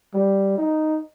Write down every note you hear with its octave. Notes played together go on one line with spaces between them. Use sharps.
G3
D#4